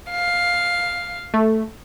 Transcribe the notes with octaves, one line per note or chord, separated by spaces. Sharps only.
F5
A3